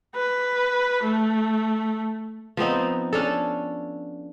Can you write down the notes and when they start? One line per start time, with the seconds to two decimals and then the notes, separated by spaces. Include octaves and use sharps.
0.15 B4
1.03 A3
2.57 F3 B3 C4 D#4
3.13 C#4 D4 A4